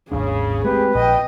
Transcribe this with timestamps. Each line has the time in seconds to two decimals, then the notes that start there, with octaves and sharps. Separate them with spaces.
0.12 G#1 D#2 C#3 D4 G#4
0.65 G#3 A3 C4 G4 B4
0.95 A#1 D#5 G5